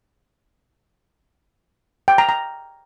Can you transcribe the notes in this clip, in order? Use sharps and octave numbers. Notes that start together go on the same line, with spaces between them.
G5
A#5
A#5